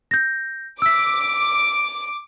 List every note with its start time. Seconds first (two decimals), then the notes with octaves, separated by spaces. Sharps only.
0.11 G6 A#6
0.82 D6 E6 B6